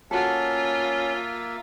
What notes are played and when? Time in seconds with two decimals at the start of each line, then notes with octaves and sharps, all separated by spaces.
0.11 A#3 C#4 F4 F#4 A4 E5